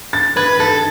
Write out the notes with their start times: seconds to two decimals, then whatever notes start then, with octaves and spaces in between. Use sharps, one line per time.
0.13 A6
0.37 B4 G#6
0.60 A4 A6